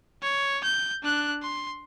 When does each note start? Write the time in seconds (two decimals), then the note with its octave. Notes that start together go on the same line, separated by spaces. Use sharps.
0.23 C#5
0.64 G6
1.03 D4 F#6
1.43 C6